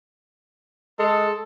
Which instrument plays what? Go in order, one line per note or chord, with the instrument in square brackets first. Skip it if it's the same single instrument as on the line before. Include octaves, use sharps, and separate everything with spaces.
[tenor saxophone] G#3 [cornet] A4